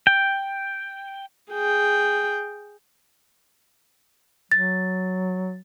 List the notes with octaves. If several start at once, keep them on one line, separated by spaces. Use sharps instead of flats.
G5
G#4 G5
F#3 A6